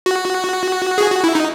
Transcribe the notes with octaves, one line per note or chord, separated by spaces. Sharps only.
F#4
G#4
F#4
E4
D#4